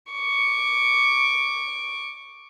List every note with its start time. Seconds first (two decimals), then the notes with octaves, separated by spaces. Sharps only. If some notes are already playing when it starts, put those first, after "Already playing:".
0.12 C#6 D6